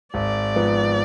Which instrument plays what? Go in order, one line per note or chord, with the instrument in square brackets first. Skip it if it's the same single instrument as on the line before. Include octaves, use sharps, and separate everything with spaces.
[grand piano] G#1 [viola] D5
[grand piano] G#2 F3 B3